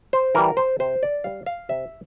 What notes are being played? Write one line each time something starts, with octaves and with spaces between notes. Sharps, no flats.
C5
E3 G3 A#4
C5
C3 C5
D5
G3 F5
F5
C3 E5